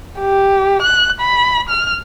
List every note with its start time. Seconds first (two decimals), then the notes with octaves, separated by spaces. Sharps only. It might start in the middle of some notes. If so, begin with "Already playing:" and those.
0.20 G4
0.82 F#6
1.20 B5
1.69 F6